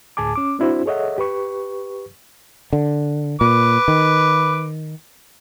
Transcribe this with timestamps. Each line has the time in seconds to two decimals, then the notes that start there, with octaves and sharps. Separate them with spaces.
0.17 D2 A2 G#4 G#5 A5 D6
0.36 C#4 D6
0.59 C4 D4 E4 F#4 C5
0.86 G#4 A4 C#5 D#5 E5 F#5
1.18 G4 B4 C#6
2.73 D3
3.41 A#2 B4 D6
3.88 D#3